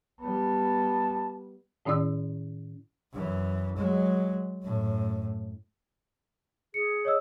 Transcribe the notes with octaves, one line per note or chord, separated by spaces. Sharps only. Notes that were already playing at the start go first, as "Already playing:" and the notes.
G3 B3 A5
A2 D#3 C#4 E4 D5 E6
F#2 E3
F#3 G#3
F#2 A2
G#4 C#7
C#5 D#5 E6